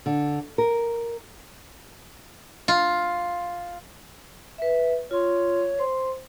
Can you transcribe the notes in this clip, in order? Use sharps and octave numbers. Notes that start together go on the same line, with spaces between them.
D3
A#4
F4
B4 E5
F4 C#5 C6
C5 C6